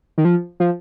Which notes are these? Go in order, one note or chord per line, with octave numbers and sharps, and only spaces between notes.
D#3
F3
F3